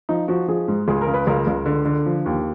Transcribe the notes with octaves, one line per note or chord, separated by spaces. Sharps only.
F3 D#4
F3 F#4
F3 G#4
G#2
C#2 G#4
A#4
C#3
B4
C#2 A#4
C#2
D3
D3
F3
D#2